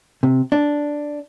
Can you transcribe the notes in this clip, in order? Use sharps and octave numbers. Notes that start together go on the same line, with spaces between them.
C3
D4